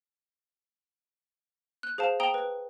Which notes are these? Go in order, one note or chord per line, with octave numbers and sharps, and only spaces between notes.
F#6
G#4 C5 F5 A5
G5 A5 A#5 D#6 D7 G7
B4